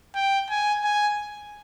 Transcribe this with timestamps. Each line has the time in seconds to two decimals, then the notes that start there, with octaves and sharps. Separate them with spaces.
0.15 G5
0.50 G#5
0.84 G#5